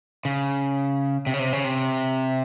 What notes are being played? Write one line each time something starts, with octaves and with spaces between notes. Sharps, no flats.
C#3
C3
C#3
C3
C#3
C3